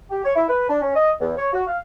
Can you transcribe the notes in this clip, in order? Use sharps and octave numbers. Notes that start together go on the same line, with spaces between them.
G4
C#5
E4
B4
D4
C#4
D#5
E2
C#5
F#4
F5